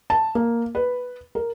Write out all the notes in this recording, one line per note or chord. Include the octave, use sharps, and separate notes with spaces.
A5
A#3
B4
A#4